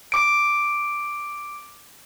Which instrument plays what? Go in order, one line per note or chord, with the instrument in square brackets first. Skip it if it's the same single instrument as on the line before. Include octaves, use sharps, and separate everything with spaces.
[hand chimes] D6 D7